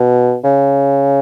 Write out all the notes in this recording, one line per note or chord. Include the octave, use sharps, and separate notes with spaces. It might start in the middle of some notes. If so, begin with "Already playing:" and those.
Already playing: B2
C#3